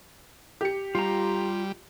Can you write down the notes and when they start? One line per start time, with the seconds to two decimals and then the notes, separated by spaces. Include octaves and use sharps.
0.61 G4 C#7
0.95 G3 F4 A#5